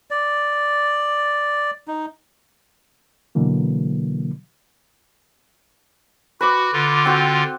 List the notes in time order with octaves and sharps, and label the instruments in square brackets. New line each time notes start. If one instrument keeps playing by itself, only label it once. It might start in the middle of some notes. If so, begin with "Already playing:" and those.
[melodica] D5
D#4
[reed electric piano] B2 D3 E3 F#3 A#3
[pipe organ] F#4 [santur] B4 D6
[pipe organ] D3 F4
[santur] C4 F#4